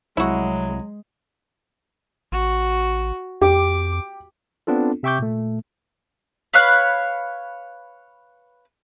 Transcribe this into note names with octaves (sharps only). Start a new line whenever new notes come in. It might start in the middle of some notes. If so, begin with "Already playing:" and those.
C2 F#3 G#3 E4 F#4
A1 F#4
F2 G4 D6
B3 C4 D4 F4 A4
C3 E5 G5 C#6 D6 G6
A#2 A3
B4 C#5 F5 F#6